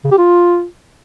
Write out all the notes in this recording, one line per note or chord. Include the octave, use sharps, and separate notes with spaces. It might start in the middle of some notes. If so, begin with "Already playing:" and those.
C#3
G4
F4